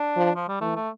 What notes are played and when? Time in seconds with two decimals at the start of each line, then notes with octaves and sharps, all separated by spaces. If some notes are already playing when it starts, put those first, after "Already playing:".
Already playing: D4
0.17 F3
0.36 F3
0.49 G3
0.61 E3 A3
0.76 A3